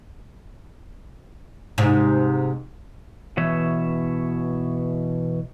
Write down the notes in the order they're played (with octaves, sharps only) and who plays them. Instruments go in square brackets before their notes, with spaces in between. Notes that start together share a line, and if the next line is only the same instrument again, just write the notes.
[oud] G#2 C3
[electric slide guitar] B2 E3 C#5 E5